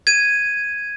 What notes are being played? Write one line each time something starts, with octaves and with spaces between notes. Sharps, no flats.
G#6 D#7